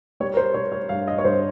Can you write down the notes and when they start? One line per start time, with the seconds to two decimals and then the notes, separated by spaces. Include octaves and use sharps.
0.20 G3 C#5
0.34 A#4
0.37 C5
0.54 G3 C#5
0.72 C#5
0.89 G2 F5
1.08 D#5
1.18 C#5
1.25 G2 C5